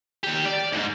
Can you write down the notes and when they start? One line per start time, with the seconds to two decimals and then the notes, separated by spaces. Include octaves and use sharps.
0.24 D#3 G4
0.45 D5
0.73 D#2 G#2